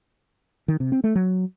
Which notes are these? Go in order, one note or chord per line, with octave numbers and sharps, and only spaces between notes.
D#3
C3
C4
A3
F#3